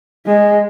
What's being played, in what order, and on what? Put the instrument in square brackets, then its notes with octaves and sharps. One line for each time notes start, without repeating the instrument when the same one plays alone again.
[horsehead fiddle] G#3